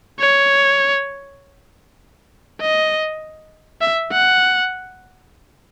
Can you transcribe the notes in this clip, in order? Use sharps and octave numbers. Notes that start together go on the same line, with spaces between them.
C#5
D#5
E5
F#5